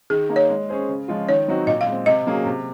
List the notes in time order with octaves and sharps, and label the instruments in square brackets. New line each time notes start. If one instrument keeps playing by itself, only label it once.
[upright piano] D#3 [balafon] G#4
[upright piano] A#3 D#4
[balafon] C#5
[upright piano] G#3
C#4 G#4 C5
C#3
F3 G#3 C#4 F4
[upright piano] D#3 [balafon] C#5
[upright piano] F#3 C4 D#4 F#4
[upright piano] A#2 [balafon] D#5
[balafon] F5
[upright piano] G#3
C4
[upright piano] C3 [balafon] D#5
[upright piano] F#3 A#3 C#4 G#4
C3